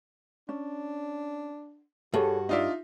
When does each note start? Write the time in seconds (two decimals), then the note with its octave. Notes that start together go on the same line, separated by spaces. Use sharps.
0.49 C#4 D4
2.14 G2 F#4 G#4 A4 C#5
2.49 D4 D#4 F4 D5 E5